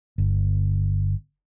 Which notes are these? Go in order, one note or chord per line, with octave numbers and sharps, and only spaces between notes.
G1